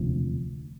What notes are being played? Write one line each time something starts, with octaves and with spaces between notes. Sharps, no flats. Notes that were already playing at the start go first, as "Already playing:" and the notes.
Already playing: E1 D2 C3 F3